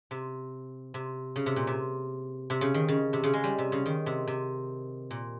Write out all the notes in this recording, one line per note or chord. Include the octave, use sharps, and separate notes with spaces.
C3
C3
C#3
C3
A#2
C3
C3
C#3
D#3
C#3
C3
C#3
G#3
G3
C3
C#3
D#3
C3
C3
A#2